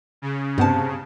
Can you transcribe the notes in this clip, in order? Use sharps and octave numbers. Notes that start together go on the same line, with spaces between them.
C#3
G2 C3 B3 A5